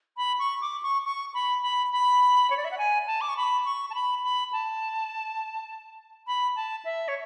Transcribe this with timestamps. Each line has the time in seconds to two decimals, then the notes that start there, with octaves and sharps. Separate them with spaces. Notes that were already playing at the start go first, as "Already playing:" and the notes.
0.17 B5
0.39 C#6
0.61 D6
0.83 C#6
1.05 C#6
1.34 B5
1.62 B5
1.92 B5
2.50 C#5
2.57 D5
2.65 E5
2.71 F#5
2.78 G#5
3.07 A5
3.21 D6
3.29 C#6
3.37 B5
3.65 C#6
3.90 A5
3.94 B5
4.23 B5
4.53 A5
6.27 B5
6.56 A5
6.85 E5
7.08 C#5